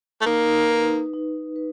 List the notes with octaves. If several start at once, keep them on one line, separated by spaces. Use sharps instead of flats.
A3
A#3 D#4
B4
D#4
B4